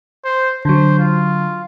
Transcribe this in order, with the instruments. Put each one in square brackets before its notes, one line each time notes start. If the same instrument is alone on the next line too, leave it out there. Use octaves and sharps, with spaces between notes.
[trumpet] C5
[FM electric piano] D3 F#3 [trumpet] C5
[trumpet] F4